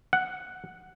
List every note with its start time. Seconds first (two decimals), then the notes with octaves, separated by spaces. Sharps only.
0.13 F#5